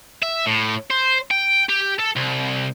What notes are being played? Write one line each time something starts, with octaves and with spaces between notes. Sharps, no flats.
E5
A2
C5
G5
G4
A4
C2